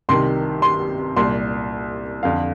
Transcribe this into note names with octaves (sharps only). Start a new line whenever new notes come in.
C2 C3 D#3 C6
C6
C2 A#2 C6
F2 D3 F5